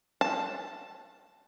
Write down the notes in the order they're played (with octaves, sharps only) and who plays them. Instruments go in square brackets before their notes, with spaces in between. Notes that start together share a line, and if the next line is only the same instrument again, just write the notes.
[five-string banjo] A5